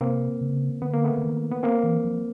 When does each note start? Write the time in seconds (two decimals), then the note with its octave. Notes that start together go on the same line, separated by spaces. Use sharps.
0.01 C3 A#3 C4
0.41 C#3
0.82 D3 B3
0.93 A#3
1.04 A3 B3
1.18 D3
1.23 D#3
1.52 B3
1.63 A#3 C4
1.83 E3
2.05 F3